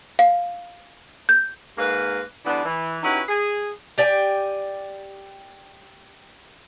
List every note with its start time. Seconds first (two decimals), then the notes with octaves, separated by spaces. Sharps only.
0.19 F5
1.29 G6
1.77 G#2 A#3 B4
2.45 D3 E3 G3 B3 D4
2.65 E3
3.03 C#4 D#4 E4 F#4 G4 B4
3.29 G#4
3.98 G4 D5 G5 G#5